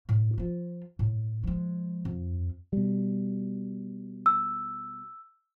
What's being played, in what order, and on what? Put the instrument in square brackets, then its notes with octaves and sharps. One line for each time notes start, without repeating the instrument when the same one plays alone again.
[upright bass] A2
F3 F4
A2
F3 G#3
F2
[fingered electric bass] B2 G3
[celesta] E6